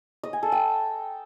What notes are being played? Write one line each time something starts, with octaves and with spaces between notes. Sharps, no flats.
D#5
G#5
A4
G5